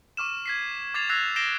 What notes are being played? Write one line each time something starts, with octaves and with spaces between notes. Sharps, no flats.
C#6 D6 F6 E7
G#6 B6 C7
D6 G#6 A6 C7 F7
E6 F#6 G#6 A#6 C7 F7
G6 A#6 C7 D7 E7 G7